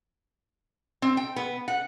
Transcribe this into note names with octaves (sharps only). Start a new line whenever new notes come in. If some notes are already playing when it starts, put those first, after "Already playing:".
C4
G5
B3
F#5